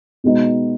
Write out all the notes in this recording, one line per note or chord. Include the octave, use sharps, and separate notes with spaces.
B2 G#3 B3 D#4